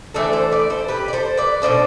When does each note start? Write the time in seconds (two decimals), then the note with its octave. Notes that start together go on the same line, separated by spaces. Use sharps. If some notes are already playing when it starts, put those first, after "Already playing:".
0.14 E3 A3 D4 A4 C5
0.33 A4 C5
0.52 B4 D5
0.70 A4 C5
0.88 G4 B4
1.08 D5
1.13 A4 C5
1.37 B4 D5
1.62 B2 G3 D4 A4 C5